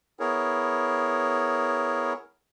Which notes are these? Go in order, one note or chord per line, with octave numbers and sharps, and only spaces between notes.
B3 E4 G#4 A#4 C#5